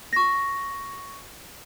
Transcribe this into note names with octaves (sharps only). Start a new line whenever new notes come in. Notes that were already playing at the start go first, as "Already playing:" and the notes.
C#6 A#6